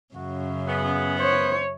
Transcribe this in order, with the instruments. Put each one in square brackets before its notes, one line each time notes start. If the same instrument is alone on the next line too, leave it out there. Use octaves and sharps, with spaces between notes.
[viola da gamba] F#2 C#3 [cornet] F#4
[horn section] B3 [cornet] G#4
[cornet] C5 [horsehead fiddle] C#5